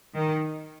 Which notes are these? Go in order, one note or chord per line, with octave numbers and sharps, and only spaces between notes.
D#3